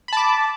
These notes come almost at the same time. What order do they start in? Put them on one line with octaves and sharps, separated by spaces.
B5 A5 D6